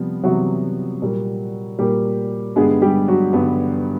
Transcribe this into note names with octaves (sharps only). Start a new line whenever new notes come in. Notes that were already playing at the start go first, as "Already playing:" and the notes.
Already playing: C3 F3 G3 B3
C3 E3 F#3 G3 B3 F#4
A#2 G3 A#3
A#2 G3 A#3 G4
G2 D3 G3 G#3 B3 G#4
G3 G4
F#3 F#4
G2 D3 G3 B3